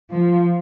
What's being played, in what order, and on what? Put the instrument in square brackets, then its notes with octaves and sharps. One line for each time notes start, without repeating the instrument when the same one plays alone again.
[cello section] F3